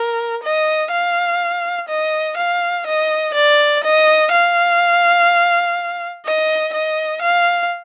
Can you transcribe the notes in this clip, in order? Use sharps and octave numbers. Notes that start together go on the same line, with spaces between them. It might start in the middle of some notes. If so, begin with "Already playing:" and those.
Already playing: A#4
D#5
F5
D#5
F5
D#5
D5
D#5
F5
D#5
D#5
F5